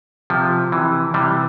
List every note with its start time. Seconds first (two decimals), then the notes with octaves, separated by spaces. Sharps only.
0.30 C3 F3
0.72 C3 E3
1.14 C3 E3 G3